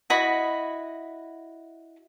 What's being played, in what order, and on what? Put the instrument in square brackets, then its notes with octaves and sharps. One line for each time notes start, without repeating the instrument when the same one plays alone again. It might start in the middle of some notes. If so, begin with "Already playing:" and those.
[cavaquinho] E4 F#4 D#5 B5